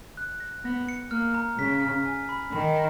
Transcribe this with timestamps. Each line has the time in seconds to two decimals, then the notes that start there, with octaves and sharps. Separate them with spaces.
0.17 F#6
0.40 A#6
0.65 B3 A#6
0.89 C#7
1.11 A#3 F6
1.34 A#5
1.58 C#3 B6
1.82 F6
2.05 G#5
2.29 B5
2.52 D#3 B5